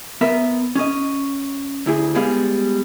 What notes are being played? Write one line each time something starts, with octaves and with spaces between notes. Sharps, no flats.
B3 A#4 E5
C#4 D#5
D2 E4 G#4
G3 G#3 B3 G#4 F5